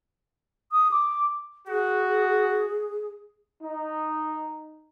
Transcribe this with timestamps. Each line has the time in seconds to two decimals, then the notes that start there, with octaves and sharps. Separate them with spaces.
0.72 D#6
0.91 D6
1.67 F#4 G#4
3.63 D#4